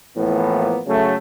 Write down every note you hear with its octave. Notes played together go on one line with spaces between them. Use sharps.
A2 E3 F3 A#3 B3
C#3 F#3 A3